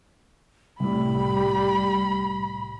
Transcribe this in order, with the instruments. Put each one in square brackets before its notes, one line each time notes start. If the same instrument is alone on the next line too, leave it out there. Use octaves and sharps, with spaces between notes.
[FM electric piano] C2 A2 [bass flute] G3 [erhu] B5